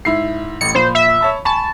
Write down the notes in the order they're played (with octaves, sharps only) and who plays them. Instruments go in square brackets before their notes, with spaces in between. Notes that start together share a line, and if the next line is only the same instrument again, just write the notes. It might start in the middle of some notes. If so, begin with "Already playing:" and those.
[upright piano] G#2 E4 C7
[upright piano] A1 A2 [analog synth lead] C#7
[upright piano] A#2 F3 B5 [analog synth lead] C5
[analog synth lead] E5
[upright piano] C#5 A5 B5
[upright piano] G#5 B5 C#6 [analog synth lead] A5